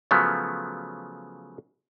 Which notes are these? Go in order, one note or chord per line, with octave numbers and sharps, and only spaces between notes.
C#3 F3 F#3 A3 B3